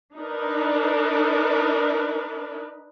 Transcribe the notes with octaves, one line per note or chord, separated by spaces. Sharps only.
D4 D#4 A#4 B4